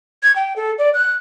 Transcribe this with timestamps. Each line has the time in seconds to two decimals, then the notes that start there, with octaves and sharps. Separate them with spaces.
0.23 G#6
0.36 G5
0.56 A4
0.78 D5
0.94 F#6